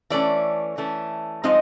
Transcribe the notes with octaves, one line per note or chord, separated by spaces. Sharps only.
E3 A3 C#4 D5
E3 A3 C#4
F3 G#3 C4 D#4 D#5